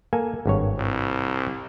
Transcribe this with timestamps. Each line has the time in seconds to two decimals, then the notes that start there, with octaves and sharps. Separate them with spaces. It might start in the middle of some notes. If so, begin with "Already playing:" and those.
0.13 A#3 A4 G#5
0.46 G#1 G2 C#5
0.77 C2